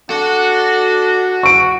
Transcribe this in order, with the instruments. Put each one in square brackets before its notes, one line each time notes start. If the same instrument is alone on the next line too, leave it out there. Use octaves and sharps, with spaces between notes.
[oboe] D4 [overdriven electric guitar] F#4 [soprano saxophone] A4
[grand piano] C#6 D7